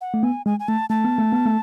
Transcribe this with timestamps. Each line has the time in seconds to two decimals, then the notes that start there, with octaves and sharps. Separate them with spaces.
0.01 F#5
0.14 A3
0.23 B3 G#5
0.46 G#3 G#5
0.60 G#5
0.68 A3 A5
0.90 A3 A5
1.04 B3
1.19 A3
1.32 B3
1.46 A3